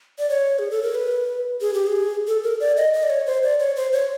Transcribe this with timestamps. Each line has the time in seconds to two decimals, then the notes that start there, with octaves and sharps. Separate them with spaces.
0.19 D5
0.30 C#5
0.59 G#4
0.71 A4
0.83 A#4
0.95 B4
1.61 G#4
1.74 G4
1.87 G#4
2.27 A4
2.43 A#4
2.60 D5
2.77 D#5
2.93 D#5
3.03 D5
3.10 C#5
3.26 C5
3.43 D5
3.60 C#5
3.76 C5
3.93 C#5